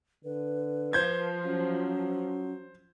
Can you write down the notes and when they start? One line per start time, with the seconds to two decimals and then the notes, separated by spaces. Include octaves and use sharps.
0.24 D3 B4
0.93 F3 C5 G6 G#6
1.44 F#3 C#4